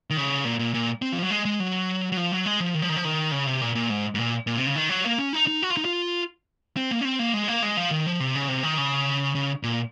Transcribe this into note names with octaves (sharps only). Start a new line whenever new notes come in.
D#3
C#3
A#2
A#2
A#2
C4
F3
F#3
G#3
G#3
F#3
F#3
F3
F#3
G#3
F3
D#3
F3
D#3
F3
D#3
C#3
C3
A#2
A#2
G#2
G#2
A#2
A#2
C3
C#3
D#3
F#3
A#3
C#4
D#4
D#4
F#4
F4
D#4
F4
C4
A#3
C#4
C4
A#3
G#3
A#3
G#3
F3
D#3
F3
C3
C#3
C3
D#3
C#3
C#3
A#2